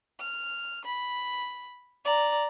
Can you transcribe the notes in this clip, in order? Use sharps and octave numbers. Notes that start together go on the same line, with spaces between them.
F6
B5
D5 A#5